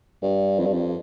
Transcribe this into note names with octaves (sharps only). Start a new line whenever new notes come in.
G2
F2
G2
F2